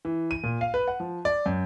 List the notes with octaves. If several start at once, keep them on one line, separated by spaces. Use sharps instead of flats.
E3
D#7
A#2
F5
B4
F#5
F3
D5
F#2